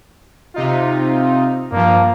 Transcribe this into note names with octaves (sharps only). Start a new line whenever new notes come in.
C3 D#4 F4
G2 F3 A#3